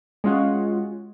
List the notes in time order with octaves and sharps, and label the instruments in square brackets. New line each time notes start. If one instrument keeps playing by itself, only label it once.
[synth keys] G#3 C#4 F4 F#4